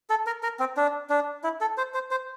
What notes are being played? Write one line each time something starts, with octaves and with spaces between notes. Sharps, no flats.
A4
A#4
A#4
C4
D4
D4
E4
A4
C5
C5
C5